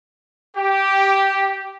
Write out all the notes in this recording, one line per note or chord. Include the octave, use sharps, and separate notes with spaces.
G4